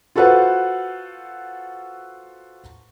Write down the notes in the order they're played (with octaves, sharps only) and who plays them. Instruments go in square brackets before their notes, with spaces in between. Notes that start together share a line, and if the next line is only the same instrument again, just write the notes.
[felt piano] F4 F#4 A4 B4 C5 F#5